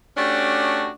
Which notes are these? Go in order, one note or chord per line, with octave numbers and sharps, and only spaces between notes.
A3 C#4 D4 F#4 G4